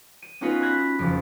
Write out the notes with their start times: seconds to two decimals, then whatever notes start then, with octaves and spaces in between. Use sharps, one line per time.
0.22 D#7
0.41 B3 C#4 D#4 F4 F#4 B4
0.60 B5 E6 F#6 G#6 A#6 B6
0.99 F#1 F2 F3